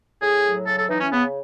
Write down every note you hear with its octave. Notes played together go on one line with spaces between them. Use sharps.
A2 G#4
F#3
C#3 A4
A4
E3 D#4
C#4
C#3 B3